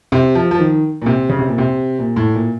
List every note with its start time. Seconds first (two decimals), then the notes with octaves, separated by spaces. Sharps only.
0.12 C3
0.35 F3
0.51 F3
0.59 D#3
1.02 A#2
1.06 C3
1.29 C#3
1.39 C3
1.48 A#2
1.58 C3
1.99 A#2
2.16 A2
2.35 A#2